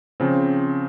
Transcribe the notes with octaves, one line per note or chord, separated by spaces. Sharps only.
C#3 F3 C4